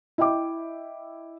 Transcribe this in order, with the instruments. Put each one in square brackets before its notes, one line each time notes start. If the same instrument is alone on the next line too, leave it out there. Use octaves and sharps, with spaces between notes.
[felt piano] E4 D#5 E5 G5 D6